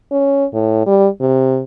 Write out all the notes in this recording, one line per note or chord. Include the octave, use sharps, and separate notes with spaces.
C#4
A2
G3
C3